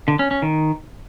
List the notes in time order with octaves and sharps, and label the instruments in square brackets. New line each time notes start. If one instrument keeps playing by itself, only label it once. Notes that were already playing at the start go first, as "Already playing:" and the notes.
[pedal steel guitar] D3
C#4
C#4
D#3